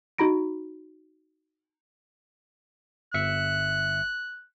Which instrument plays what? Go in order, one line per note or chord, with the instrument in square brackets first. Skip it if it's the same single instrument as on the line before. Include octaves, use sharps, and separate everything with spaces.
[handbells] D#4 F#4 A#5 B5 A#6 D7
[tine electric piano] G1 E5 C#7 [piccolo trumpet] F#6